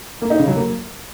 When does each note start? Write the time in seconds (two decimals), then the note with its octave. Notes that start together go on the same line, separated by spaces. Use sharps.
0.22 A#3
0.30 D#4
0.39 C#3
0.47 F#3
0.56 A#3